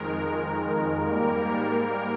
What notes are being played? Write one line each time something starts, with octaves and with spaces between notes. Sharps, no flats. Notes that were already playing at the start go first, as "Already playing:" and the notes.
Already playing: F2 D#3 G#3 A#4
G#2 G3 A#3 A#4
A#4